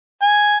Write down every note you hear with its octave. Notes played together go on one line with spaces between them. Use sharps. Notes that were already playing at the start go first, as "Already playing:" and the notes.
G#5